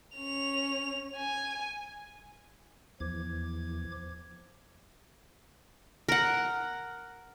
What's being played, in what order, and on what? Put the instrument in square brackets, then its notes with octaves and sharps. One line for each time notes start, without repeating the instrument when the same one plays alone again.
[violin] C#4 F7
G#5
[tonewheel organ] E2 [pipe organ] F3 D6 G#6
[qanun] A#4 F#5